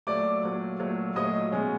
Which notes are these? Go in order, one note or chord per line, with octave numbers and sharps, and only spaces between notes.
A#2 F#3 A3 D5 D6
A#2 F#3 A3
A#2 F#3 A3
A#2 F#3 A3 D#5 D#6
B2 G#3 C#4